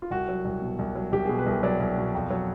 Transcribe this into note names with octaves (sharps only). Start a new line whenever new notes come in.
F4
C2 F#4
F#3
C2
B2
C2
F#3
C2 G4
B2 G#4
B4
C2
F#3 D5
C2
B2
F2
F#3